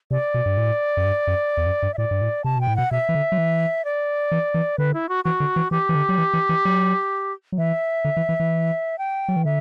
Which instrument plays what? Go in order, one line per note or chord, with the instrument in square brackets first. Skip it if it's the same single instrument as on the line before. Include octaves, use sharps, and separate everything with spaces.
[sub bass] C3 [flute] D5
[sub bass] B2
G2
A2
F#2
G2
F#2
E2
F#2
G2
[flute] E5
[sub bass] A2 [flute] D5
[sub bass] G2
A2
[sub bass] C3 [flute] A5
[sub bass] B2 [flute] G5
[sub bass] A2
[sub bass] B2 [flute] F#5
[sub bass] B2 [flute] E5
[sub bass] E3
D3
F#3
E3
[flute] D5
[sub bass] E3
E3
[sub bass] D3 [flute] B4
[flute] E4
F#4
[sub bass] E3 [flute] F#4
[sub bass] D3
E3
[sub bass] E3 [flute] G4
[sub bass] E3
D3
F#3
E3
E3
E3
F#3
F#3
[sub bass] E3 [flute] E5
[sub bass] D3
E3
E3
E3
[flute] G5
[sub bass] F#3
E3
[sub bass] D3 [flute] E5